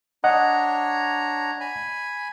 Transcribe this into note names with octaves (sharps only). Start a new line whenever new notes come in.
D4 C#5 D#5 F#5 A#5
G#5 B5